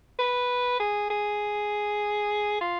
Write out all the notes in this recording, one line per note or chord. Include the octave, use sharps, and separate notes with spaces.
B4
G#4
G#4
F4